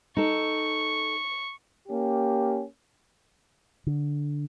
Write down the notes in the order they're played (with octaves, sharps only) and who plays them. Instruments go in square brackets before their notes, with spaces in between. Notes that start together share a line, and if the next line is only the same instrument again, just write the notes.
[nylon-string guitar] D#4 A4 [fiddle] C#6
[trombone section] A#3 C#4 G4
[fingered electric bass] D3